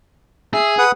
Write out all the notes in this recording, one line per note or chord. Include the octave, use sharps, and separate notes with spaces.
G#4 E5
B4 F#5 D#6